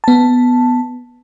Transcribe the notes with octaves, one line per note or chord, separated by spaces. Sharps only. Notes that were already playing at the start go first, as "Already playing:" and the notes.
B3 A5